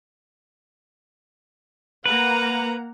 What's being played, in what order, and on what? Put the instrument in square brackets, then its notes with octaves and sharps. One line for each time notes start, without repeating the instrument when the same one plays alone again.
[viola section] A#3 F#5 A#5 [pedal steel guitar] B4